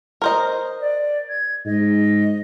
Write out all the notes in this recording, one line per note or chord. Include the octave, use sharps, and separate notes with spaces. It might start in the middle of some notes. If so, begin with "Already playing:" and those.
A#4 C5 D#5
D5
G#6
G#2 D#5